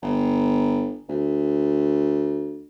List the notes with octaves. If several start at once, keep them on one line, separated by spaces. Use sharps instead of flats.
G1
D2